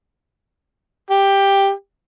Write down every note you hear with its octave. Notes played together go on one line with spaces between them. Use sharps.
G4